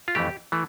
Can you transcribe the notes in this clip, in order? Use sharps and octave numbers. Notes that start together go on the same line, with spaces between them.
F4
F2 E3 A3 G4
E3 A3